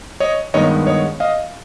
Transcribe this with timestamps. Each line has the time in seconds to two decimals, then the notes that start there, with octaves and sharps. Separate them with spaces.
0.20 C#5 D#5
0.54 G2 D#3 G#3 B3 C#5 D#5
0.87 C#5 D#5
1.20 D#5 F5